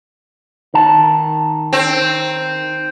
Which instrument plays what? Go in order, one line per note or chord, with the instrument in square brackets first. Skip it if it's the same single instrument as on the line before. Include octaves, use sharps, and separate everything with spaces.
[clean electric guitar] D#3 A5
[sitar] C4